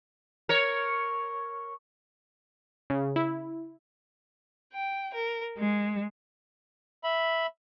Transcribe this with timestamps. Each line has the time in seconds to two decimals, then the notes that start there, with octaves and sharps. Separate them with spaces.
0.49 A#4 C#5
2.90 C#3
3.16 E4
4.73 G5
5.14 A#4
5.58 G#3
7.04 E5 B5